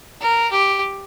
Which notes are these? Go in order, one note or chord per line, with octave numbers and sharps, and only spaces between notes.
A#4
G4